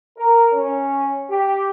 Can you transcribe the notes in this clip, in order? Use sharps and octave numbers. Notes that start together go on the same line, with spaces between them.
A#4
C#4
G4